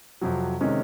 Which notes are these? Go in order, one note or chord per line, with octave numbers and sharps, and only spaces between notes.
F2 C3 F#3
C3 D#3 G#3 C#4